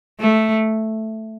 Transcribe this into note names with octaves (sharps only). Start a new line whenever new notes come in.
A3